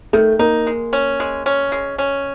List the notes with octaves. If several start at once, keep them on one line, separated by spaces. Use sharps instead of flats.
D#3 A3
A#3 D#4
G#3
C#4
G#3
C#4
G#3
C#4